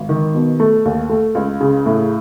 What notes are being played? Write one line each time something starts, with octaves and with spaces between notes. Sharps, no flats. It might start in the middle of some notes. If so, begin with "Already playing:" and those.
Already playing: G#1
D#3
B2
A3
D#2
A3
C#2
C#3
A2